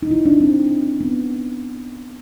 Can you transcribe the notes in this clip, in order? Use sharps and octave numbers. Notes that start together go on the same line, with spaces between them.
D#4
B2 G#3 E4
D4
C4
B3